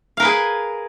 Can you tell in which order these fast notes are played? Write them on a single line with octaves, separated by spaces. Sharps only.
F5 A#4 B4 G#4 G#5